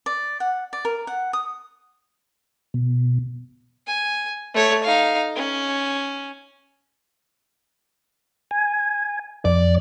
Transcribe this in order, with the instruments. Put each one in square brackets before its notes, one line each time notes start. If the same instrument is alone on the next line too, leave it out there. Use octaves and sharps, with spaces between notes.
[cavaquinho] D5
F#5
D5
A#4
F#5
D#6
[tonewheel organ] B2
[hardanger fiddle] G#5
A3 C#5
D#4 F5
C#4
[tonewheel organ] G#5
[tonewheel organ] F2 [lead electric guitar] D5